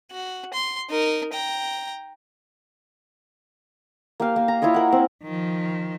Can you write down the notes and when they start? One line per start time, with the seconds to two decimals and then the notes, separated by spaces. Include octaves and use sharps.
0.11 F#4
0.53 C6
0.90 D#4 A#4
1.33 G5 A#5
4.20 A#3 G4 F5
4.36 A#3
4.48 A#5
4.62 E4 F4 C#5 D#5
4.74 A#4 F#5
4.92 C4
5.23 D#3 F3